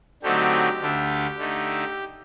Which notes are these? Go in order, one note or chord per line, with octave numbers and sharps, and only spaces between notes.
D3 F#3 A3 C4 D#4 G4
D2 D3 A3 D4
D3 A3 D#4